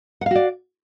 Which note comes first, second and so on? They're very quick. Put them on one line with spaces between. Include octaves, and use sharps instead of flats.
F#5 F5 F#4 D5